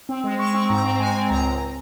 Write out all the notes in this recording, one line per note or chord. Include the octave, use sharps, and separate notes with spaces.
C4
G#3
G#3 C#6
C4
G#2 A#5
C4
G#3 G#5
C4
C#2 A#5
C#2